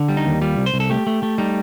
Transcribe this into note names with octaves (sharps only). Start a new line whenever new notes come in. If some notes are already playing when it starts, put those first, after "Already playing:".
Already playing: D3
G3
D#4
D#2
G3 F4
C2
C5
C2
A4
A3 G4
A3
A3
G3 D#4